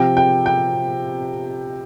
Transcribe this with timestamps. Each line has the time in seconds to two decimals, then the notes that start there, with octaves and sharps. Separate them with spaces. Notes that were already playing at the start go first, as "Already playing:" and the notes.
Already playing: C3 F3 G5
0.17 G5
0.46 G5